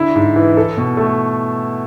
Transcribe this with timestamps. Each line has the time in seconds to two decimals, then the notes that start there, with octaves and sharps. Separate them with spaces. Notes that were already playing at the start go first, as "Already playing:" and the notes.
Already playing: D3 E4
0.15 G#2
0.36 E3
0.57 A4
0.77 B2
0.97 A3